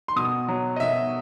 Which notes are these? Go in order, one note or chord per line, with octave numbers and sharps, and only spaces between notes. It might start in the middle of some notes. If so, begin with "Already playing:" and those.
C6
B2 D#6
F#3
D#5
B2 E5